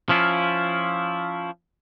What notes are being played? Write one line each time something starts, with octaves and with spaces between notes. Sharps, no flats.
F3 C#4 E4 F4